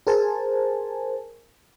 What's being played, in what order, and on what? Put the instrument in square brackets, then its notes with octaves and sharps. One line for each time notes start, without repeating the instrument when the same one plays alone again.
[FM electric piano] G#4 A#4 C5 G#5 A5